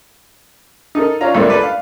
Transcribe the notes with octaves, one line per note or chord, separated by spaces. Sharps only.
D#4 A4 A#4
C#4 D4 F4 A#5
C#2 G2 G3 A3 A#3 C4
D4 A4 B4 D5
F5